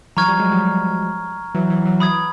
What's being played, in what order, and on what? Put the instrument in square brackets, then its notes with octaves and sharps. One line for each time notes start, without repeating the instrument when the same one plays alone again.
[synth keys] E3 F#3 [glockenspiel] A#5 C#6 F6 G#6
[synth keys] F3 G3
F#3 G#3
F3 G3
E3 F#3
E3 F#3
E3 F#3
[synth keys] E3 F#3 [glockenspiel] B5 D#6 G#6